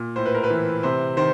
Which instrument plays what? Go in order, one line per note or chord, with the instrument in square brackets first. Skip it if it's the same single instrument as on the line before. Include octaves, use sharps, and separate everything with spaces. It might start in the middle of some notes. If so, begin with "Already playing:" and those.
Already playing: [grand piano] A#2
A2 C5
B4
A#4
B4
E3
C3 C5
D#3 C5